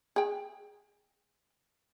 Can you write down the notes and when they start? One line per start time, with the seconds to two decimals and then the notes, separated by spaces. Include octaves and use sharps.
0.16 G#4 G5